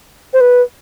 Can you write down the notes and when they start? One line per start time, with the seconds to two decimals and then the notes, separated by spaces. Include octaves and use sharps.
0.33 C5
0.41 B4